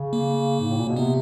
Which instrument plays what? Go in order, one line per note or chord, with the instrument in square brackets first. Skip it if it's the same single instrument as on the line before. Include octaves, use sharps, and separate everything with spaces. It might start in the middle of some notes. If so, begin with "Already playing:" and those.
Already playing: [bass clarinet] C#3
[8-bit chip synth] A#3
[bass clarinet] G#2
A2
A#2
B2
[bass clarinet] C3 [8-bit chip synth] B3